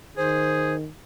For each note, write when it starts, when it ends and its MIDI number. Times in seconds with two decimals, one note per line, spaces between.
0.17 0.88 51
0.17 0.74 68
0.17 0.76 72